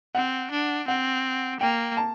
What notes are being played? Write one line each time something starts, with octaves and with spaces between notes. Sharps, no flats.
C4 F#5
D4
C4 F#5
A#3 G5
A5